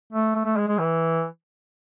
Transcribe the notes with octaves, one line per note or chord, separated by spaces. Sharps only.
A3
A3
A3
G#3
G#3
E3